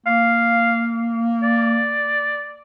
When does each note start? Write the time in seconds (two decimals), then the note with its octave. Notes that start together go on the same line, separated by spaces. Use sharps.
0.06 A#3 F5
1.43 D5